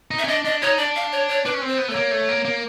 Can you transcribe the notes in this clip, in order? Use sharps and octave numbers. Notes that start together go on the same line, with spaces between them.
D#4
E5
C#4
D4 D#5
D4 D#5
D#4 C#5
D4 D5
F5
C#5
C#5
D4 B4
C#4
C4
C5
B3
A3 C#5
A#3
A3
A#3
A#3